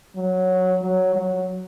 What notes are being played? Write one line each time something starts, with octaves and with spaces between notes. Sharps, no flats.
F#3
F#3
F#3